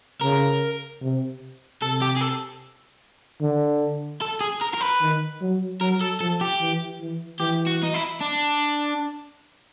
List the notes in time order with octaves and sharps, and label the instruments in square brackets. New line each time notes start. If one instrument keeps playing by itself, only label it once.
[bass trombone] C#3 [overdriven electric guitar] A#4
[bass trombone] C3
[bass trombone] C3 [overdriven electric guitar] A4
[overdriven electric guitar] G4
G#4
A4
[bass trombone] D3
[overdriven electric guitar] A4
G#4
A#4
A#4
B4
[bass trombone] D#3
F#3
[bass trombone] F#3 [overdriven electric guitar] A#4
[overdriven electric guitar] A4
[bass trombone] F3 [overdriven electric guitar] A4
[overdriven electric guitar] G4
[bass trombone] E3
E3
[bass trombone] E3 [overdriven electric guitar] G4
[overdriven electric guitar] F#4
D#4
E4
D4